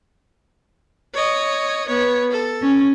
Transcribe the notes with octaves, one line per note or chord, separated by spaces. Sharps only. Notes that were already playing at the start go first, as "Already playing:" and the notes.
C#5 D#5
B3 C#5
A4
C#4